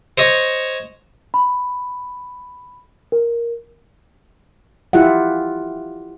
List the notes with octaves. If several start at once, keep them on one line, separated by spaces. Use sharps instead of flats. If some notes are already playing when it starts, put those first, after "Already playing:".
C5 C#5 D#5
B5
A#4
E4 F4 G4 E5 F#5